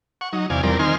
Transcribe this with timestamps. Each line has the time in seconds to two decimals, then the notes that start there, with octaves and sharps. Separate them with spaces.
0.21 F#5 C#6
0.33 F#3 D#4
0.50 E2 C3 D5 F5 G#5
0.63 E2 F3 G3 C4 A#4 D5
0.79 D#3 C4 D#4 G#5 C6 F6